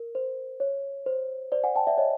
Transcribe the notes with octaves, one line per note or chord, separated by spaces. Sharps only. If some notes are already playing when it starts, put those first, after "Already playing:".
Already playing: A#4
C5
C#5
C5
C5 D5
F#5 G#5
G5 A5
D5 E5
C#5 D#5